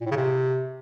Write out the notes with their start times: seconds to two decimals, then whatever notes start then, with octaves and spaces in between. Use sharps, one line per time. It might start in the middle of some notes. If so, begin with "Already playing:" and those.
0.01 A#2
0.06 A2
0.11 C#3
0.16 C3